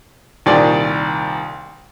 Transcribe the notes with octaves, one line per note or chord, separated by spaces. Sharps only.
C2 A#2 D#3 D5